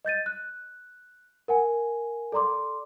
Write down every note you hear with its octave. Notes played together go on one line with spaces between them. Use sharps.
D#5 G6 A6 D#7
F#6
A#4 F#5 G#5
A4 D5 A#5 C6 D6